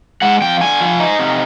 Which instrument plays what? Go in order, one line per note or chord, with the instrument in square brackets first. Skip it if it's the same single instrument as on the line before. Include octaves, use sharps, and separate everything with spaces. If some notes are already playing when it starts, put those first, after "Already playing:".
[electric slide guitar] G#3 F#5
F2 G5
D3 G#5
F3
D#4
C3